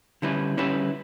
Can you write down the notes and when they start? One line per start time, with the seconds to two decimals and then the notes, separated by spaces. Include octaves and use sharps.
0.22 D3 G3 C#4 E4 B4
0.57 D3 G3 C#4 E4 B4